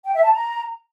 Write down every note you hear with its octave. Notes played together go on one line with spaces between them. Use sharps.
G5
E5
A5
A#5